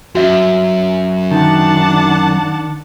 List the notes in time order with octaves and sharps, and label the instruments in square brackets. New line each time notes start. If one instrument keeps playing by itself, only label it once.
[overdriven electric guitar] F#2 [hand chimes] F#4 E5
[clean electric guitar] D#3 [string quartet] D4 F#5 A5